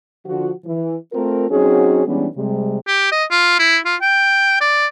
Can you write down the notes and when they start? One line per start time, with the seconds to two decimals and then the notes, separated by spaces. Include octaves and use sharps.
0.25 D3 F3 F4 F#4
0.65 E3
1.13 A3 C4 F4 A#4
1.49 F#3 C4 C#4 D#4 F#4 G#4
2.06 E3 G3 G#3 B3 C#4 D4
2.36 C3 G3 G#3
2.87 G4
3.12 D#5
3.31 F4
3.59 E4
3.85 F4
4.01 G5
4.61 D5